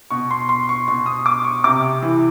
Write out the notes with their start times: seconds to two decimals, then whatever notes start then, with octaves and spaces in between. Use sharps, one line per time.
0.11 B2 C#6
0.31 C6
0.49 C6
0.69 C#6
0.88 B2 C#6
1.06 D#6
1.26 D6
1.44 C#6
1.64 C3 D6
2.02 E3